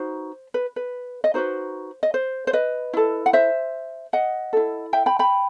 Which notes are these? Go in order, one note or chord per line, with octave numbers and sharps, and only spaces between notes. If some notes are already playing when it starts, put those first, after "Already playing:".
Already playing: D#4 F#4 B4 C5
B4
B4
D#5
D#4 F#4 B4 C5
D#5
C5
C5
B4 D#5
E4 A4
F#5
C5 E5
D#5 F#5
E4 A4
E5 G5
G5 B5
G5 B5